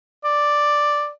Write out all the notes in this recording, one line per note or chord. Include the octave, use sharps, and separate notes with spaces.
D5